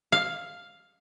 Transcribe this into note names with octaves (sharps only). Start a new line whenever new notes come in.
F5